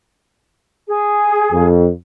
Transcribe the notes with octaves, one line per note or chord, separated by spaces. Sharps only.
G#4
F2